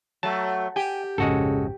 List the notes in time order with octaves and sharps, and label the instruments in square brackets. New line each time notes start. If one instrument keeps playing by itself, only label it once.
[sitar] F#3 A3 [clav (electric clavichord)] A5
[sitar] G4 [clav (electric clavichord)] G5 G#5
[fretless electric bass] A#1 F2 G#2 [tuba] C#3 [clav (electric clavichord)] G#3 F#4 A4